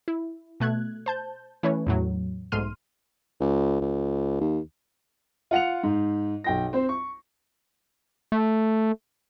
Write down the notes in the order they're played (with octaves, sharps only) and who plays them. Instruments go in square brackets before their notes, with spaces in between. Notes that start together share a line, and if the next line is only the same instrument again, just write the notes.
[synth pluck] E4
B2 A3 F#6 G#6
C5 A5 G6
E3 A3 C#4 B4 C#5
E2 A2 F#3
B1 G#2 A3 C6 F6 D#7
[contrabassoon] C#2
C#2
D#2
[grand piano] F4 F#5 C#7 F7
G#2
B1 G5 A#6
C4 C5
C#6
[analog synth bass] A3